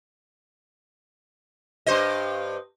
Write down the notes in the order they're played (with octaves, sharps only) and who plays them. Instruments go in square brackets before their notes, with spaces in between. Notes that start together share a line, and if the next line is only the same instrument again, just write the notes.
[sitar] G2 C5 D#5